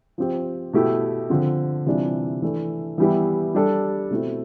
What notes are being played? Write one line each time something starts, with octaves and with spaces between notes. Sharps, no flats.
F3 C4 G4
B2 A3 E4 G4
D3 F3 C4
C3 E3 G3 D4 F4
E3 A3 D4
E3 G3 B3 E4 G4
G3 D4 A4
B2 A3 C4 E4